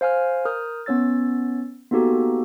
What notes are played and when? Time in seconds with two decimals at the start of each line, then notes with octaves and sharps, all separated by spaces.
0.01 C5 F5 G#5 F6
0.45 A#4 D#6 F6 G6
0.86 B3 C#4 C#5 E6 A6
1.91 A#3 B3 D#4 F#4 G4 A4